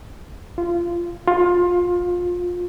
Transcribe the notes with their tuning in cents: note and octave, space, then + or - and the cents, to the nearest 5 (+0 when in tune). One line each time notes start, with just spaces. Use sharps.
F4 -20
F4 +20